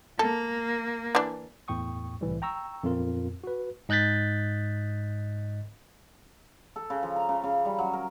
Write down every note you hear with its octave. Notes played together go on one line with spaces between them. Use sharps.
A#3 A4
E3 D4
E2 A2 G5 C#6 D#6
C2 A2 E3 G3
G5 A#5 C#6 E6
F2 A#2 C4 F4 A#4
F#4 B4
G#2 D#5 F#6 G6 A6 B6
A4
C#3
F3
A#5
C#3
C#3
G3
F#3
A#4